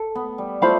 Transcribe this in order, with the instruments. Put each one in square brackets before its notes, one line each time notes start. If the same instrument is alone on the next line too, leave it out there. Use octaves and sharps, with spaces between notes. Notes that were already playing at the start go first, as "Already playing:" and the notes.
Already playing: [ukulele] A4 A5
[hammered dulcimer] B3
G3
[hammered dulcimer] A3 [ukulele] F4 C5 F5 B5